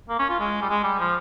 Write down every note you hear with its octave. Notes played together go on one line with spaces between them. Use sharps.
A#3
C#4
F4
G#3
G3
G#3
G3
F3